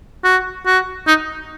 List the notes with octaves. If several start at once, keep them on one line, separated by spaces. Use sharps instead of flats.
F#4
F#4
D#4